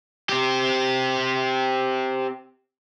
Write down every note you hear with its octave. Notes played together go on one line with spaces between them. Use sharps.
C4 G4